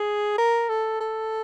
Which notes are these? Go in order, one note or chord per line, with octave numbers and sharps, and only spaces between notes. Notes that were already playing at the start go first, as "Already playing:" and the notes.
Already playing: G#4
A#4
A4
A4